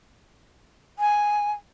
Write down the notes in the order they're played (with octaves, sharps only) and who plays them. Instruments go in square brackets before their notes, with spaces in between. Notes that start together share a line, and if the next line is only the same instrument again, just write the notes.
[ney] G#5